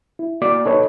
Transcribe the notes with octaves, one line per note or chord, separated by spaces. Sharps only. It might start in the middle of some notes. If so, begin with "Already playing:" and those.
E4
A#3 F#4 D5 D6
D#4 A4 B4 C#5 D#5